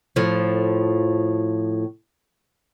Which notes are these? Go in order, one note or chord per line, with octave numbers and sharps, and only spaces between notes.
A2 F3